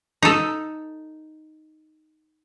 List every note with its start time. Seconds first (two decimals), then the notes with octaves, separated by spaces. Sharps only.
0.22 D#4 A4